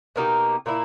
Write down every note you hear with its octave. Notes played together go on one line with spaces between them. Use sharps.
B2 A#3 D#4 G4
A#2 A#3 E4